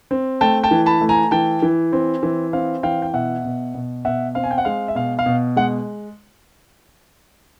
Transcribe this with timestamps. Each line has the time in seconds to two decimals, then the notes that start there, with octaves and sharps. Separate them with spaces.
0.11 C4
0.41 A3 G5 A5
0.63 G5 A5
0.71 E3
0.86 A5 B5
1.01 A3
1.09 G#5 A#5
1.31 E3 G5 A5
1.62 E3
1.93 C4
2.23 E3
2.53 C4 F5
2.83 E3 F5 G5
3.02 G5
3.13 B2 E5 F#5
3.45 B2
3.74 B2
4.05 B2 E5 F#5
4.35 C4 F5
4.44 G#5
4.51 G5
4.58 F#5
4.65 G#3 F5
4.88 E5
4.95 B2 F5
5.19 F5
5.26 B2
5.56 G#3 F#5